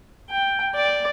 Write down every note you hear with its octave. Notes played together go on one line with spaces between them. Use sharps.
G5
D5